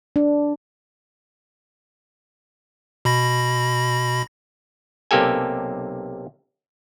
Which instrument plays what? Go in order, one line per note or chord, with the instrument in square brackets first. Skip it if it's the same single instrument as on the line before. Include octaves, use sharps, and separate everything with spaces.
[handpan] D4
[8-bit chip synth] B2 B5 A#6
[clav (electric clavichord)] B1 C3 A#3 G4 A4 G#5